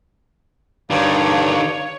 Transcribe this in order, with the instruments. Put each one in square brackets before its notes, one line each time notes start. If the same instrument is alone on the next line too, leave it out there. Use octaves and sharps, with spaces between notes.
[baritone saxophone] G2 [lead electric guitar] D3 D#3 [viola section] C#5 [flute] F5